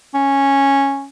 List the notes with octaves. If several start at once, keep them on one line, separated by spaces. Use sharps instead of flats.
C#4